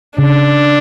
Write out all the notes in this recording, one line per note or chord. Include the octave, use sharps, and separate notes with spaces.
C#3 D4